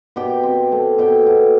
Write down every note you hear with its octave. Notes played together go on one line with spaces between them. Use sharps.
B2 G4 G5
C4
A3
B2 G4 G5
B2